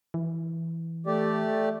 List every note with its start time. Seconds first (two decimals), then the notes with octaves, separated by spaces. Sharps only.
0.14 E3
1.07 A3 G4 D5